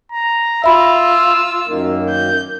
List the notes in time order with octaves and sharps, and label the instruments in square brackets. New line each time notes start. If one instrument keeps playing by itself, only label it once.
[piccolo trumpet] A#5
[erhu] F4 [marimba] E5 B5 [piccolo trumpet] E6
[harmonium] F#2 D#3 A#3
[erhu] G6